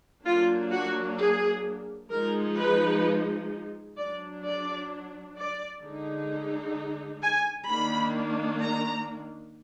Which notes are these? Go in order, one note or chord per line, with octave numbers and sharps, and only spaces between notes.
F#3 A#3 D4 F4
F#4
G#4
F3 G#3 D#4 A#4
B4
F#3 D4 D5
D5
D5
D3 G#3 D#4
G#5
D#3 A#3 D4 B5
A#5